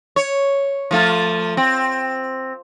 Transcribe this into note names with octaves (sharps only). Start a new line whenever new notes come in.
C#5
F3 A3 F4
C4